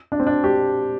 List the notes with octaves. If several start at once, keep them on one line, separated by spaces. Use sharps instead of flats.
D4
C4
D4
G4